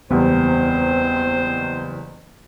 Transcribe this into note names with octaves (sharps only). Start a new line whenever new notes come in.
F#1 E2 G3 B3 C4 C5